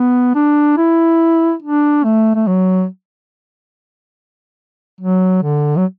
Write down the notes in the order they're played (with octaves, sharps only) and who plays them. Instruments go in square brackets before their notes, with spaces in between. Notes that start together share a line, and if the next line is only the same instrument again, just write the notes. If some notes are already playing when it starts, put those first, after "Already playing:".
Already playing: [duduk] B3
D4
E4
D4
A3
A3
F#3
F#3
D3
F#3